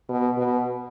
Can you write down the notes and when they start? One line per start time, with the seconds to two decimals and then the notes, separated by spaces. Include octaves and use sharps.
0.09 B2
0.38 B2